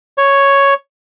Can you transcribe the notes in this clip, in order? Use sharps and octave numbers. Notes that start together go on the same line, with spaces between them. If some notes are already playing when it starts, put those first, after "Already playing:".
C#5